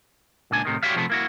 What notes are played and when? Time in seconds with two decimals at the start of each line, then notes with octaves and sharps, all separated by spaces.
0.51 C#2 A#2 D4 G#5
0.65 A2 C3 D#3
0.83 F#4 G4 C#5 D5 E5 F5
0.96 C3 F3 A3 B3
1.10 A#3 E4 F#4